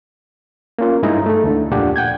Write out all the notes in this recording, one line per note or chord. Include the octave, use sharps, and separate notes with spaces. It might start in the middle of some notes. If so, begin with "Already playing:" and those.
A#3 C#4 F4
G2 G#3 D#4 E4 A#5
A3 A4
D2 D3
F2 A#2 D4 F4 G4 F#5
F#5 G5 G6 G#6